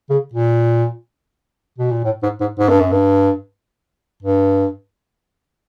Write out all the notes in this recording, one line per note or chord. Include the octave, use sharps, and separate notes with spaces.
C#3
A#2
B2
A#2
A2
G#2
G#2
G#2
G2
F#2
G2
G2